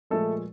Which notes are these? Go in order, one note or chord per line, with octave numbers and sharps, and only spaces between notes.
A#2 F3 G#3 A3 A4